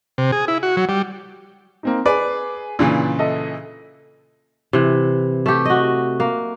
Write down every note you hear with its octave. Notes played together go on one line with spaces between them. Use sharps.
C3
G#4
E4
F#4
F#3
G3
A#3 C4 D#4
G#4 B4 D5
A#2 C#3 E3 D4
A4 D#5 E5
C3 E3
A3 G4
F#4 D#5
A#3